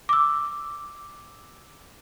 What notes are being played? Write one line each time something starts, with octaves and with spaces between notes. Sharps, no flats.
D6 E6